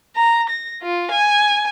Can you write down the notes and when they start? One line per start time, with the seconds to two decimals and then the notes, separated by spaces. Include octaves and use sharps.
0.16 A#5
0.49 A#6
0.83 F4
1.11 G#5